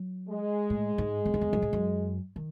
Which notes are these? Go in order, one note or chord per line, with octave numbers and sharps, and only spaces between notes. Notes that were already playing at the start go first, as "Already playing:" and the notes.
Already playing: F#3
G#3
A2
G#2
E2
F#2
E2
F#2
G#2
F#2
D#3